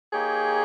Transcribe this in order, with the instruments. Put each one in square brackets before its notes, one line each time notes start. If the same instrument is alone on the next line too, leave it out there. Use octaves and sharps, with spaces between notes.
[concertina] A#3 D#4 G4 C#5 G5 [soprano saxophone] G#4